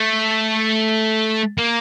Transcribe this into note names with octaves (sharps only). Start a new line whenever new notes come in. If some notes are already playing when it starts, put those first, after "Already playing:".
Already playing: A3
A#3